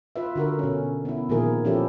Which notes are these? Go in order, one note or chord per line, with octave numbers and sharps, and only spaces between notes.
F4 B4 E5
D3 F#4 A#4
B2 C#4
B3 E4
A#2 D#3 F3 A#3 G#4 A#4
F3 C#4 E4 G4 A4